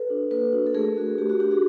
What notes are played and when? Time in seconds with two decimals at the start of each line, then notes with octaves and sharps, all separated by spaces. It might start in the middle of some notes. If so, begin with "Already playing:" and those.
Already playing: A4 B4
0.09 D4 F#4
0.31 A#3 A4 B4
0.53 D4 F#4
0.67 A4
0.74 A3 G#4 A#4
0.96 D4 F#4
1.18 A3 G4
1.29 F#4
1.40 D4 F#4 G4
1.51 F#4 G#4